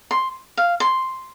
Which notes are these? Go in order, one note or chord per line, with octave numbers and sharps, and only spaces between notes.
C6
F5
C6